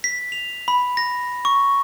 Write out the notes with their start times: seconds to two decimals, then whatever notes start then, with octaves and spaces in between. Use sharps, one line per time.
0.04 B6
0.32 F7
0.68 B5
0.97 A#6
1.45 C#6